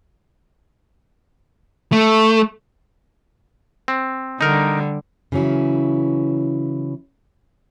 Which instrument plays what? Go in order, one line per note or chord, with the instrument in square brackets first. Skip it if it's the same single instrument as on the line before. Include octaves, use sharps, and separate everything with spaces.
[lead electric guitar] A3
[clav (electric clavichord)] C4
[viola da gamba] D3 G3 [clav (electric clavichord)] D#4 A#4
[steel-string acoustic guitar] C#3 E3 F#3 C#4 E4